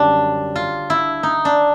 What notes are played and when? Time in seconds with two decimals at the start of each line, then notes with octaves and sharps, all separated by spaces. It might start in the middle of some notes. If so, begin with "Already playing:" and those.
Already playing: F#2 D3 G3 D4
0.56 F4
0.90 E4
1.23 D#4
1.45 D4